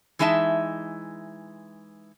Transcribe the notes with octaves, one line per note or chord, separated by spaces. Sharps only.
E3 G#3 D#4 E5 A5